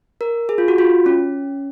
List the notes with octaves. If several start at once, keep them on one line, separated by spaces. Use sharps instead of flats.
A#4
G#4
F4
F#4
F4
C#4